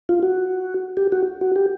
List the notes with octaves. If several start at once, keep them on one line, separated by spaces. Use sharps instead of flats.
F4
F#4
G4
F#4
F#4
G4